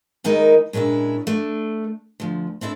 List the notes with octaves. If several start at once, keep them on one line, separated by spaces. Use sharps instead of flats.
D#3 G#3 A#3 D#4 E4 A#4
A#2 G#3 C#4 D4 E4
A3 D4
D2 F3
C4 D4 E4 A4